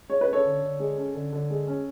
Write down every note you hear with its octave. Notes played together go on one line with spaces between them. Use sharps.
G#3 C#5
B4
C#4
A4 C#5
D3
D3
G#3
C#4
D3
D3
G#3
C#4